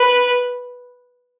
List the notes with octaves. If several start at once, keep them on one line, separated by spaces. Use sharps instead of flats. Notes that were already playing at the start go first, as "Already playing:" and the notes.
Already playing: B4